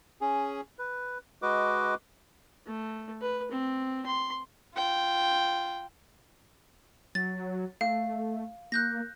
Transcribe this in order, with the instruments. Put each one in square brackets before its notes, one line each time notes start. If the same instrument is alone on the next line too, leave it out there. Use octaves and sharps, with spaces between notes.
[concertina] C#4 G#4
B4
G#3 F#4 B4 D#5 D6
[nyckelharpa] A3
B4
C4
C6
[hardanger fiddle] F4 G5
[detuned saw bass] F#3 [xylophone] A6
[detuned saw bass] A3 [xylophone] F5
[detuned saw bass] A#3 [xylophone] F#6 G6 A#6